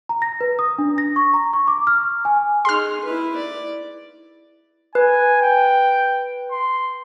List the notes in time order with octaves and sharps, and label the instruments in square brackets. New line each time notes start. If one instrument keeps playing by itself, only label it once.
[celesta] A#5
A#6
B4
D#6
D4
A#6
C#6
A#5
C#6
D6
F6
G#5
[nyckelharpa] D#4 G#4 [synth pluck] C6 F6
[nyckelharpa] E4 B4
D5
[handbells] B4 [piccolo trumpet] G#5
[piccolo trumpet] G5
C6